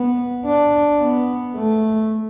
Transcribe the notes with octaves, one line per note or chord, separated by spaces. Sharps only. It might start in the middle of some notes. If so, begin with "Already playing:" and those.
Already playing: B3
D4
B3
A3